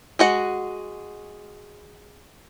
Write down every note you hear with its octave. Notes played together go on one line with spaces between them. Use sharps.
G#3 F#4 F#5